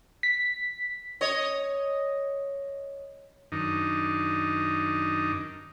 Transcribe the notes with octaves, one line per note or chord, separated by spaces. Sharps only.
B6
C#5 D#5
F#2 D#3 D4 D#4